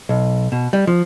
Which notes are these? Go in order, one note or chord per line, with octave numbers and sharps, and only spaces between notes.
B1
B2
G3
F3